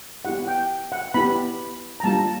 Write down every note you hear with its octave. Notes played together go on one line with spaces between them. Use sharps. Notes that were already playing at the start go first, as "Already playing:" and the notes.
B3 E4 G4 F#5
G5
F#5
B3 E4 G4 B5
A#5
G3 A#3 D4 F4 A5